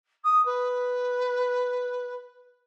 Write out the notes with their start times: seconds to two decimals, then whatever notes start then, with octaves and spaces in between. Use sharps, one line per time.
0.24 D#6
0.45 B4